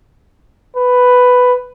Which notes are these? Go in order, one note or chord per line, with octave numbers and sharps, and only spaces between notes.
B4